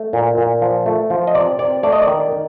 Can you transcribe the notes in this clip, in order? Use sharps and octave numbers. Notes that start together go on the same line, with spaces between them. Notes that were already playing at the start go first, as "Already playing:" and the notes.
Already playing: A3
A#2
A#2
F3
A3
F3
D#5
C3 D5
C3 D5
A3 D5
D#5
D5
D#3
D#3